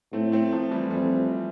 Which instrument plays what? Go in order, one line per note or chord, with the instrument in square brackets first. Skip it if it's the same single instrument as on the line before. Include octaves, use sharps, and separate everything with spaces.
[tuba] A2 [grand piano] A3 C4
[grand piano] A3 C4
F3 A3
E3 G3
[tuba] F2 [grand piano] E3 G3